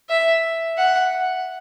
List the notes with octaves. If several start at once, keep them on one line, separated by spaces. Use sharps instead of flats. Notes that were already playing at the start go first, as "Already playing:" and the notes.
E5
F#5